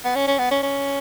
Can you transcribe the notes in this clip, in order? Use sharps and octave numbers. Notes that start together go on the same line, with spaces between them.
B3
C#4
C#4
B3
C#4
C#4